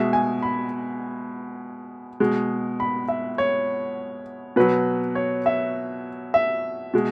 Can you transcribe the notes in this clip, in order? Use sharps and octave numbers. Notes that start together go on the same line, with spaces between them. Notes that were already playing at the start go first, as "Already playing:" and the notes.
Already playing: B2 G#3 E5
G#5
B5
B2 G#3
B5
E5
C#5
B2 F#3 B4
C#5
E5
E5
B2 G#3